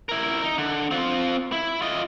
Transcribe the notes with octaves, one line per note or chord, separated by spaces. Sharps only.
E4 A#4
D#4
D3
C4 F4
E4
F4 D#5